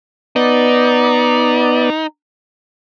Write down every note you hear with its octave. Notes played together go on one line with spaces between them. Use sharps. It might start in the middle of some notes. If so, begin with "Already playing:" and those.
B3 D#4 D5